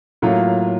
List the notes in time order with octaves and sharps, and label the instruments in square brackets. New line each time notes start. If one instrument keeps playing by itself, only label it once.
[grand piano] A2 F#3 A#3 F4